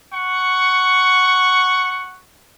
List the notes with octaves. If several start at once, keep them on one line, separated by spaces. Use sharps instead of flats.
F#5 C#6